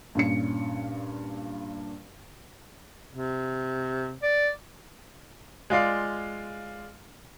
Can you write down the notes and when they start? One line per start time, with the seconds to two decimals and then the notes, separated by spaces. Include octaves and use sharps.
0.15 G2 A#2 C#4 C#7
3.14 C3
4.22 D5
5.70 G#3 F4 D5 F5